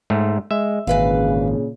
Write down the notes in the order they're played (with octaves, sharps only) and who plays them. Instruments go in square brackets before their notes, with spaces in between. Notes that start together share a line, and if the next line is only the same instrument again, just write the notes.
[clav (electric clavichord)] G#2 A3
[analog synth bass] G#3 [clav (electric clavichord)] E5
[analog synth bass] G#1 [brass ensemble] A#2 C#3 [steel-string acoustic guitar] E3 B4 F5